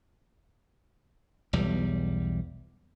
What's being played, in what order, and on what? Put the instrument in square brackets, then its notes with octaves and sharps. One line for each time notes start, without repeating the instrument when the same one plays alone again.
[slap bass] B1 E2 G3